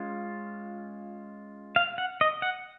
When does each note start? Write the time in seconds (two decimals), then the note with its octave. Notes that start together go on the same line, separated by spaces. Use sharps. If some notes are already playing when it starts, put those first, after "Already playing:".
Already playing: G#3 C#4 F4
1.76 F5
1.98 F#5
2.21 D#5
2.42 F#5